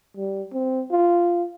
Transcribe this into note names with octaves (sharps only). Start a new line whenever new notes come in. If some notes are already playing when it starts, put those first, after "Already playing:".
G3
C4
F4